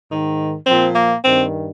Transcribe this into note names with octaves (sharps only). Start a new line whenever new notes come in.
G#2 D#3
A#2 F3 C4
A#3
G2 D#3 C4